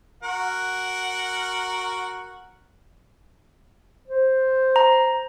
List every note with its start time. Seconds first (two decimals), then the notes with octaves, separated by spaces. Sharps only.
0.23 F#4 A#4 F#5
4.08 C5
4.76 A#5